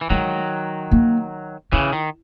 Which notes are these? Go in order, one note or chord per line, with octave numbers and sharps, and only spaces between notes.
E3
D#3 F#3 G#3
A#3
C#3 E3 E4
D#3